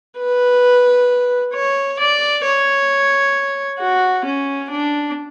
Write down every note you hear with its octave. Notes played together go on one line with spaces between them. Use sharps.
B4
C#5
D5
C#5
F#4
C#4
D4